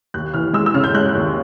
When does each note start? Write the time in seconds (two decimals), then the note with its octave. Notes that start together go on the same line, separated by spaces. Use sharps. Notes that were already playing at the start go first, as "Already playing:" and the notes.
0.14 D#2 F#6
0.34 E3 F6
0.53 G#3 E6
0.66 E6
0.74 C#3 F6
0.84 G6
0.94 G#3 F#6
1.15 D#2